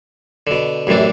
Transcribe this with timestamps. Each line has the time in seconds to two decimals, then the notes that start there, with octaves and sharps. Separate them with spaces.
0.47 B2 D3
0.87 A1 F#2 C3 E3 D4